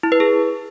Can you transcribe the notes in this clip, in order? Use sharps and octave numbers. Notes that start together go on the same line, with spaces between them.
E4
B4
G#4